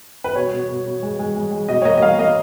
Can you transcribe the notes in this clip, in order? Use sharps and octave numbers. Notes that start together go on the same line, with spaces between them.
B4
B2 C#5
B2
B2
B2
G#3
G#3
G#3
G#3
B2 D#5
C#5
A#3 D#5
D#5
A#3 F5
A#3 D#5